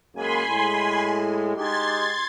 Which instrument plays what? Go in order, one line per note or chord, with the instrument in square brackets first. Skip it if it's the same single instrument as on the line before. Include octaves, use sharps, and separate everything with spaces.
[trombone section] F#2 G#3 A#3 [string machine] G#5 B5 C6
[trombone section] A2 G#3
[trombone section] G#3 D#4 G4 [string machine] C6 G#6 A6